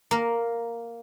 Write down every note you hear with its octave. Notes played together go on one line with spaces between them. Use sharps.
A#3 A#4